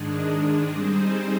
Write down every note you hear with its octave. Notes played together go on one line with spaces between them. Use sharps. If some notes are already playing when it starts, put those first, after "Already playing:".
Already playing: G#2 D#3 G#3 D4 G#4
G3 C4 D#4 G#4 C5